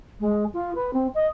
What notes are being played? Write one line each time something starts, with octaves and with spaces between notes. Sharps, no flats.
G#3
F4
B4
C4
D#5